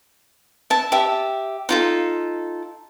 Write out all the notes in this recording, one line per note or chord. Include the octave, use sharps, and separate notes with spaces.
E5 A5
G4 E5
D#4 F4 A4